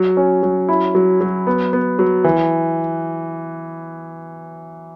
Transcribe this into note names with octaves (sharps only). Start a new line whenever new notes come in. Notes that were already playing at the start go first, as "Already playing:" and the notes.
Already playing: F#3
C#4
F#3
E4
F#3
F#3
B3
B3
F#3
E3